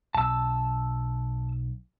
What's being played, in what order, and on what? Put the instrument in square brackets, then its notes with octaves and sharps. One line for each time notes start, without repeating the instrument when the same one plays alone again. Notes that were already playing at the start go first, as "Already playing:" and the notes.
[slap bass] B1 [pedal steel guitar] A5 E6